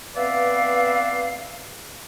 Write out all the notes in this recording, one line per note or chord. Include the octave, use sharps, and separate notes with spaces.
B3 C4 B4 D5 E5 F5